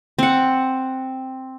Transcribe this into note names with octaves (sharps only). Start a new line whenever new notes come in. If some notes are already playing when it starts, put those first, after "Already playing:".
C4 F#5